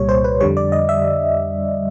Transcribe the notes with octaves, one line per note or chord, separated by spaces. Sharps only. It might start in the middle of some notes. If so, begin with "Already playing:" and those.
Already playing: C2 A#2 G3 C#5
C5
B4
F2 D3 G3 C#5
D5
D#5
E5